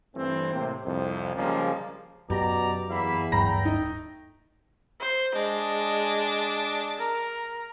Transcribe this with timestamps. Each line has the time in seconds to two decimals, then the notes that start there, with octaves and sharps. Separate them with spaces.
0.16 G2 E3 A3 C4
0.53 A2 C3 A#3 C4
0.84 C2 F2
1.36 C#3 F3 G3 G#3 A#3
2.30 F#2 B2 G4 D5 A#5
2.90 E2 A#3 E5 B5
3.32 D1 G2 F#3 A3 G5 A#5 B5 A#6
3.65 D#4
5.00 C5
5.35 G#3 D4
6.99 A#4